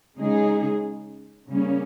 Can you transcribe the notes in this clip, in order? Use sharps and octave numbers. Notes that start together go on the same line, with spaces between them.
C#3 G#3 D#4 G#4
C#3 G3 A#3 C#4